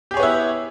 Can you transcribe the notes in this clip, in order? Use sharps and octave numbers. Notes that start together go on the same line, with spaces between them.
B3 E4 G4 G#4 C#5